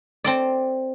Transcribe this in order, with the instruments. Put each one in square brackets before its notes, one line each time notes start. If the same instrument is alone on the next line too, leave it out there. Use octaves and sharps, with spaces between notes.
[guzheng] C4 A4 D5